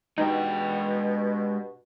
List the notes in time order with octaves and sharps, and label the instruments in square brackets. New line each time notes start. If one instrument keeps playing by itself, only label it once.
[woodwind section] G2 B2 [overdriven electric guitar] G#3 G5 [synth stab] D#4